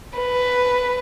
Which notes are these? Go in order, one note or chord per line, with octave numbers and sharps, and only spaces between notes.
B4